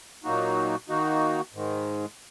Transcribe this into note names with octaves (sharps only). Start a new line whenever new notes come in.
A#2 F#3 A#3 D#4 F#4
D#3 A#3 D#4 F#4
G#2 D#3 G#3